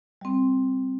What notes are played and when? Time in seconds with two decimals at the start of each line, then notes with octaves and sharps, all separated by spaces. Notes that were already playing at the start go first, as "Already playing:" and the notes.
0.21 G3 C4